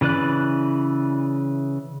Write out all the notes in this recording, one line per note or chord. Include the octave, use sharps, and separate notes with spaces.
C#3 E3 B4 D5 F#6